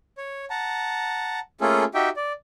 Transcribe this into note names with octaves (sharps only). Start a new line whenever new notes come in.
C#5
F#5 A5 A#5
A3 A#3 C#4 F4 G#4 A4
D#4 F#4 G4 E5 G5
D5